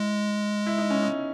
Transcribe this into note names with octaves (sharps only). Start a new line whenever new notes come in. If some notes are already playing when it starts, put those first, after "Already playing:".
Already playing: G#3 E4
E4
D#4
C#4
D#4